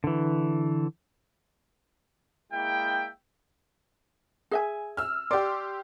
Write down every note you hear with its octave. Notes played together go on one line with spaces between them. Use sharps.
D3 E3
G#3 A#3 E4 E5 G5
G#4 E5 G#5
E6 F6
G4 D5 C6